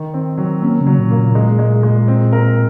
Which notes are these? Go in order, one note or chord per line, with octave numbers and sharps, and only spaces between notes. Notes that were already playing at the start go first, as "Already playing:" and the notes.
Already playing: D#3
C4
F#3
A#3 C#4
C#3
F#3
A#2
A#3
A#2
G#3
G#3
G#3
C4
A#4